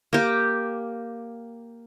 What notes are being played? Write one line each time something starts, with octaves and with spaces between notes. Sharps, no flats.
A#3 G4